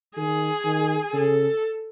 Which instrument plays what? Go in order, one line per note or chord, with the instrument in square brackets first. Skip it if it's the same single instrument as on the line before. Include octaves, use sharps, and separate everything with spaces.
[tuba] D#3 [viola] G#4
[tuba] D#3
[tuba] C#3 [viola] A4